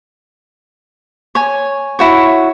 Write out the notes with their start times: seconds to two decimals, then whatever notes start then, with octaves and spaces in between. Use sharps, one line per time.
1.35 C#5 G#5
1.99 E4 F#4 C#5